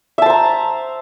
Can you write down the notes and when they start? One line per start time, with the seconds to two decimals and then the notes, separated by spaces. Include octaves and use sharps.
0.18 E5
0.22 A5
0.26 C5
0.30 A#5